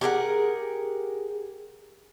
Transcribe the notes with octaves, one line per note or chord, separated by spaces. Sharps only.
G4 G#4 A#4 F#5